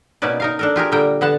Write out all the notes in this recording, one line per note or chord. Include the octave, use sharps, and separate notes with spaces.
B2 A#3 C#4 D#4 B4 D5
D#4 A#4 F5
D4 A4 A#4
F4 G4 G#4 A#4
A#2 D3 G3 A#4 G5 A#5
D3 B3 F#5 A5